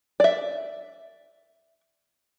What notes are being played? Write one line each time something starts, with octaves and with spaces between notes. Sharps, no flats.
D5 E5